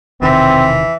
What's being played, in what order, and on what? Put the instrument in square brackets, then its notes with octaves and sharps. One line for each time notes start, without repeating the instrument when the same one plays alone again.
[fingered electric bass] E1 C3 D#3 [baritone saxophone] E3 [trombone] C4